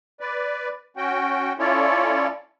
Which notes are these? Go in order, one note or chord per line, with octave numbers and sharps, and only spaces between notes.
B4 D5
C#4 F#4 G5
C#4 E4 F4 A4 C#5 D5